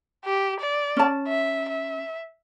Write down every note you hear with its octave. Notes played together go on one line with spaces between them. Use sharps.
G4
D5
C#4 A5
E5
E5